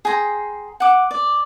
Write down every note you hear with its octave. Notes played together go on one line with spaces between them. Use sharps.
G#4 G5 A#5 C6
F#5 D6
D5